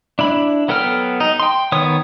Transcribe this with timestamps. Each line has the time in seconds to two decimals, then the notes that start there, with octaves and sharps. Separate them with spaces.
0.19 D4 E4 B5
0.68 F#3 B3 A4 G5 F6
1.20 D#4
1.40 G5 C6
1.72 D#3 B3 C#5 D#6